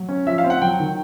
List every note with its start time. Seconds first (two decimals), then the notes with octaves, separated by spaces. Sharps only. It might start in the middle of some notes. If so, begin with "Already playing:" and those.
Already playing: F#3
0.09 C#4
0.26 F3 E5
0.38 F5
0.44 C4
0.50 F#5
0.62 F#3 G5
0.80 D#3